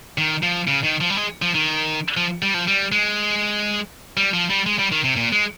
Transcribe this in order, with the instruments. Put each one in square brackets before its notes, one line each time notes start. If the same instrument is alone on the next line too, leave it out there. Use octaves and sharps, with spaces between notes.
[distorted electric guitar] D#3
F3
C#3
D#3
F3
G3
G#3
F3
D#3
F3
G3
F3
G3
G#3
G3
F3
G3
G#3
G3
D#3
C3
A#2
G#3